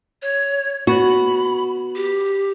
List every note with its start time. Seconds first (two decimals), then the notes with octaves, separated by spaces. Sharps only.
0.22 C#5
0.87 B3 F#4 B5
1.95 G4